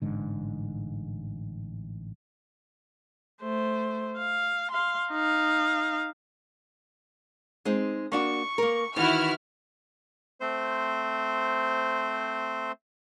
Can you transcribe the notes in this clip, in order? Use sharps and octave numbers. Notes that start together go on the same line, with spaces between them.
A1 G#2 D3
A3 C5
F5
F5 C6
D#4 F5
G#3 C4 D#4
A#3 D4 F#4 C#6
A#3 A#4
D#3 E3 E4 F#4 F6
A3 C4 C5